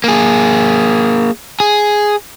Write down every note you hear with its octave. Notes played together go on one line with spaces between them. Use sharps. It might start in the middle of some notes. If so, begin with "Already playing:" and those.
A#3 G#4
G#4